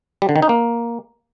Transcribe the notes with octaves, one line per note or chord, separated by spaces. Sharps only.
G3
D3
D#3
D#4
A#3